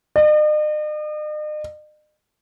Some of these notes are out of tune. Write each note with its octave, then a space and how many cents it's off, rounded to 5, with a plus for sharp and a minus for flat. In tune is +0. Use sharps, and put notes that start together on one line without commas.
D#5 -45